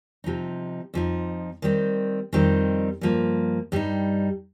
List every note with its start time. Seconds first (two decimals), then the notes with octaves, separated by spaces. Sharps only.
0.24 C3 F3 D#4
0.94 F2 F3 D#4
1.62 D#3 G3 C4
2.33 F2 D#3 G3 C4 D#4
3.01 G2 F3 A#3
3.72 G2 G3 D#4